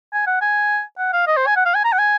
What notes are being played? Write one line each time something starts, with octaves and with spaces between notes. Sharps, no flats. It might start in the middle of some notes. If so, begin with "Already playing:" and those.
G#5
F#5
G#5
F#5
F5
D#5
C5
G#5
F#5
F5
G#5
A#5
F#5
G#5